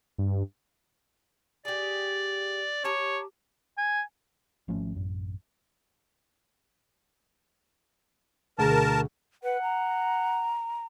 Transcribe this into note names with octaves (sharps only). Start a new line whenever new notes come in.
G2
G4 G#4 D5
G4 C#5 A5 A#5
G#5
G#1 F3 A3 C#4
A1 F#2
D2 B2 G#4 A#4 A5
B4 F#5
A#5